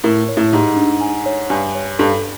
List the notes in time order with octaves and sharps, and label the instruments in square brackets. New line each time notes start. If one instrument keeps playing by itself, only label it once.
[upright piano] A2 [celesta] A#4
[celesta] C#5
[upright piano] A2
[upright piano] G#2 [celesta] G4
[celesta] D4
G#5
C#5
[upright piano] G2 [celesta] G#5
[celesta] C#5
[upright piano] G2 [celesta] A4